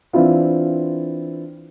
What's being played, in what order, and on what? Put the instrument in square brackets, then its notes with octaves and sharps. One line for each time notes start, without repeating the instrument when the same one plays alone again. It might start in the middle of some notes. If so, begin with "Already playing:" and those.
[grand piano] E3 C4 D4 E4 F4